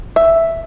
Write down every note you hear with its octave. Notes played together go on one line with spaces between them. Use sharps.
E5